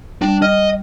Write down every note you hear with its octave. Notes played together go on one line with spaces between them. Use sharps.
G3 D4
D#5 F6